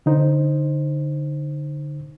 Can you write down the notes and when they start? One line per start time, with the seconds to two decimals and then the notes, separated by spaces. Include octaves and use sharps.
0.06 D3 D#4 C5